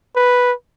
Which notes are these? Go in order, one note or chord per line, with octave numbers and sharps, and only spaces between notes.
B4